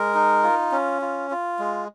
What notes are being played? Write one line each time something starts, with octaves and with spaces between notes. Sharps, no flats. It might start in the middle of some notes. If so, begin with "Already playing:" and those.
Already playing: G#3 A#4
D#4
F4
C#4
F4
F4
G#3